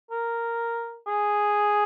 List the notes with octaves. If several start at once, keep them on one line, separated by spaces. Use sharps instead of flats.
A#4
G#4